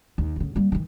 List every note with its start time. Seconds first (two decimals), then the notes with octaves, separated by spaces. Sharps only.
0.18 D#2
0.36 D2 C#3
0.56 G3 A#3
0.72 D#3 E3